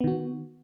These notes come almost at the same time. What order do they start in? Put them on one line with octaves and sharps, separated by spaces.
B3 D#3 F#4